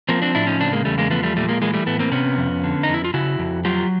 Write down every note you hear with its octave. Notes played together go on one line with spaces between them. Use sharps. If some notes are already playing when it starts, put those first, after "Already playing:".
F3 A#3 C4
C4 D4
A2 D4 E4
C#4 D#4
C#3 C4 D4
G#3 A#3
E2 G3 A3
G#3 A#3
F3 A3 B3
G3 A3
A#2 G3 A3
G#3 A#3
E3 G#3 A#3
G3 A3
A2 A3 B3
A#3 C4
C3 B3 C#4
F2
D3
D#4
F2
E4
F4
C#3 E4 F#4
F2
F#3 F4 G4